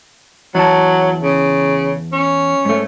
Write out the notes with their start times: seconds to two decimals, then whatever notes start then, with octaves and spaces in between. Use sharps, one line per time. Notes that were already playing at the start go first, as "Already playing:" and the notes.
0.55 E2 F#3 A5
1.22 C#3
2.12 C#4
2.65 G#2 A3